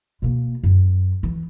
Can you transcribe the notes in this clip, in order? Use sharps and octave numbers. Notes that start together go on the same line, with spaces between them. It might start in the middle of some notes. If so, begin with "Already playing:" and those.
B2 A#3
F#2
E3